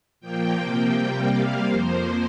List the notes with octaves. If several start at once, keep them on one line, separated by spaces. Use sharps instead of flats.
A#2 F3 A#3 G5
C3 F3 A#3
C3 G3 A#3
C3 G3 A#3 F5
F2 F3 A#3 C5